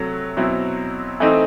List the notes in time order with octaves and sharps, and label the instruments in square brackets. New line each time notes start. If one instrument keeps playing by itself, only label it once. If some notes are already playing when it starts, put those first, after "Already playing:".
Already playing: [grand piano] C3 F#3 A3
B2 F#3 C4 E4
E3 A3 C4 D#4